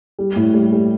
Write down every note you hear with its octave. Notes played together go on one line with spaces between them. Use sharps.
G3
A2
G3
G3